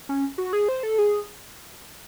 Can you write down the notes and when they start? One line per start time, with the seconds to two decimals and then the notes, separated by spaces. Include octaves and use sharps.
0.09 C#4
0.38 F#4
0.53 G#4
0.69 C5
0.83 A4
0.98 G#4